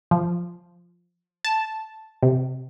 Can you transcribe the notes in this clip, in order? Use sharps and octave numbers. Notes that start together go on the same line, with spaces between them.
F3
A5
C3